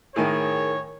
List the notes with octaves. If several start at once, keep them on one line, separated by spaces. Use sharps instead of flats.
A2 D#3 G#4 A#4 C#5 G#5